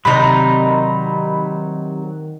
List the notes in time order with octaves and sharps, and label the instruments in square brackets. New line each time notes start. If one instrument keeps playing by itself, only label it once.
[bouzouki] C3 D#4 [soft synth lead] D#3 [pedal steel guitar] F#3 D5 A#5 [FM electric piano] B5